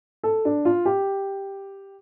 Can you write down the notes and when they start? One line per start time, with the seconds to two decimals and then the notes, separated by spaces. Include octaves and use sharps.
0.23 A4
0.45 D4
0.65 F4
0.85 G4